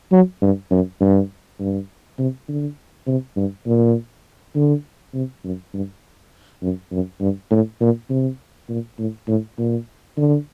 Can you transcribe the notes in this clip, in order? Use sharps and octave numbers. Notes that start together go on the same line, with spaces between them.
F#3
G2
F#2
G2
G2
C3
D3
C3
G2
A#2
D3
C3
F#2
G2
F#2
F#2
G2
A2
A#2
C3
A#2
A2
A2
A#2
D3